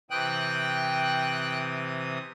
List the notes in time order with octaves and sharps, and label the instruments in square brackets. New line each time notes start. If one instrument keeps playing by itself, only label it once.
[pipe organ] C3 E3 D#6 [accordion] G5 F#6